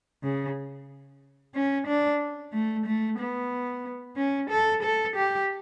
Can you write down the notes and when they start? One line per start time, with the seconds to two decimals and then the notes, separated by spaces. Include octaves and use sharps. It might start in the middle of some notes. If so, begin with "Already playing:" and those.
0.23 C#3
1.55 C#4
1.87 D4
2.53 A3
2.86 A3
3.19 B3
4.16 C#4
4.50 A4
4.83 A4
5.16 G4